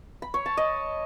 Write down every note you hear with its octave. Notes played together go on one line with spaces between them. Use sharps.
B5
C#5
A5
D#5